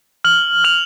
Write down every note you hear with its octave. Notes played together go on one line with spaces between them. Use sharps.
F6 F#7
F6 F7